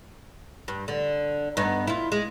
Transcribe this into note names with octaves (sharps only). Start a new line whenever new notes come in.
G2
D3
G2 B3 D#4
E4 F4
G#3